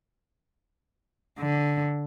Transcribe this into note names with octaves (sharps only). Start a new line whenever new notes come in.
D3